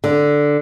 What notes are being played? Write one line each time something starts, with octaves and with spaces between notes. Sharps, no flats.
D3